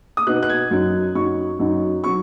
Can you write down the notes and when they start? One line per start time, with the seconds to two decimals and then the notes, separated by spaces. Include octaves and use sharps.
0.17 D#6
0.27 B2 B3 D#4 F#6
0.43 F#6
0.50 G#6
0.71 F#2 F#3 D#4
1.15 F#2 F#3 D#4 C#6
1.59 F#2 F#3 D#4
2.04 F#3 C#6